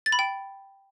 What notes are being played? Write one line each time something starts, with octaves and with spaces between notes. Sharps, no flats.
A6
B5
G5